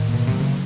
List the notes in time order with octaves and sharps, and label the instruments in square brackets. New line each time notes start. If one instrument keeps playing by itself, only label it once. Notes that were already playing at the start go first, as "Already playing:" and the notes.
Already playing: [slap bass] A2 [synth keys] D#3
[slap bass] A#3
[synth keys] B2
[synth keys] C3 [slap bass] F#3
[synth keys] C#3